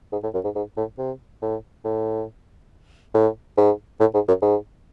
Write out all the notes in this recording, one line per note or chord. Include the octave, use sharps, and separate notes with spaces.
G#2
A2
F#2
G#2
G#2
A2
C3
A2
A2
A2
G#2
A2
G#2
F#2
G#2